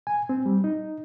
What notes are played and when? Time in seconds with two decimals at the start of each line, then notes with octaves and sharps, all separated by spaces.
0.07 G#5
0.29 C4
0.46 G3
0.64 D#4